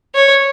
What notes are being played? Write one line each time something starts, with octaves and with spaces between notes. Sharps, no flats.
C#5